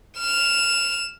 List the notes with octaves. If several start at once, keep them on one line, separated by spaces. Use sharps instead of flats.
F6 E7